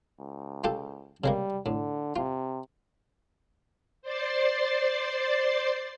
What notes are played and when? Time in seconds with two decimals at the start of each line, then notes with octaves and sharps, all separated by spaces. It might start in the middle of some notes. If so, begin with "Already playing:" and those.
0.20 C#2
0.64 F4 G4 A4
1.24 C#3 G3 G#3 A#3
1.66 A2 D3
2.16 C3 F4
4.02 C5 D5 A6 C7